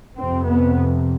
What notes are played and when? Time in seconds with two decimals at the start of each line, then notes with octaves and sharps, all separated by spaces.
0.18 F2 C3 C4
0.46 B3